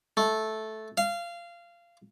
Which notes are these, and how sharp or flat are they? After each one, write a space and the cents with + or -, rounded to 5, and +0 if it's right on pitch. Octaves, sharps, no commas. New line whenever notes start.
A3 -10
F5 -20